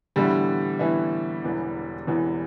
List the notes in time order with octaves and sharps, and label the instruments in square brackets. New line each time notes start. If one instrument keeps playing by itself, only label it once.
[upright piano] A2 E3 B3 E4 [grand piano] D3 G3
[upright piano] A2 E3 B3 E4
E1 E2 E3
E1 E2 E3